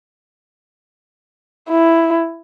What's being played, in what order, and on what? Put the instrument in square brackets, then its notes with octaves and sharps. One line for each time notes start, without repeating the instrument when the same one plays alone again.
[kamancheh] E4